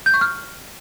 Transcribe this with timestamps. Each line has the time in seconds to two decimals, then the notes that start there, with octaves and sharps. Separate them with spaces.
0.06 G6
0.14 C#6
0.21 F6